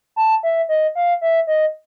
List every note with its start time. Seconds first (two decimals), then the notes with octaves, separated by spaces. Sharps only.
0.16 A5
0.43 E5
0.69 D#5
0.95 F5
1.21 E5
1.47 D#5